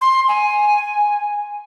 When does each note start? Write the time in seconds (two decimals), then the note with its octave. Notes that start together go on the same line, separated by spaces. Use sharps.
0.01 C6
0.28 G#5